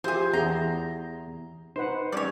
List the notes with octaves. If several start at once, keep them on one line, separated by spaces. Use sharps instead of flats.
F3 E4 G4 G#4 C5
E2 E4 G#4 A#5 C6
D#4 B4 C5 F#5
G3 G#3 C#4 C#5 D5